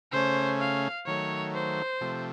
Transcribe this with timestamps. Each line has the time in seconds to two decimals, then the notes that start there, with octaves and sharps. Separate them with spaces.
0.12 C#3 A3 C#4 C5
0.60 F5
1.06 D#3 F#3 A3 C#5
1.54 C5
2.01 C3 F3 A3